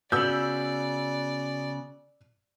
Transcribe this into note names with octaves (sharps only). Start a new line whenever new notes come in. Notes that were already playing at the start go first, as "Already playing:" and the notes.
C#3 B3 F#4 D5 E6 G6 F#7